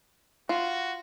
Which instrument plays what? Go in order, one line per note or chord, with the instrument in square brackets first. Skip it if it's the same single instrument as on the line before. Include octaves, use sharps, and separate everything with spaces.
[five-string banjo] F4 [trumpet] F#4